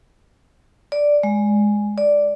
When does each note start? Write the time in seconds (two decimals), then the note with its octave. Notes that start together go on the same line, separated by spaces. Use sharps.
0.92 D5
1.23 G#3
1.98 D5